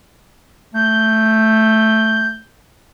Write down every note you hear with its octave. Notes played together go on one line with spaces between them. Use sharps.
A3 G6